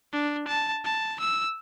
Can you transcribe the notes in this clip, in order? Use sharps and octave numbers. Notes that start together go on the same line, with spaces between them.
D4
A5
A5
E6